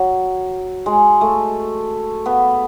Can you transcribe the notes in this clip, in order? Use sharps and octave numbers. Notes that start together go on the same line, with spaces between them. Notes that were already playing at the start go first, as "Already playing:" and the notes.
Already playing: F#3
G#3
A3
B3